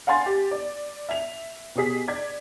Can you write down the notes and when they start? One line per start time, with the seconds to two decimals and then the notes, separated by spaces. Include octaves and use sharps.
0.07 F5 F#5 G#5 C6 A6
0.26 G4
0.51 D5
1.09 E5 F7
1.75 B2 G4 G#4 B6
2.08 D5 G#6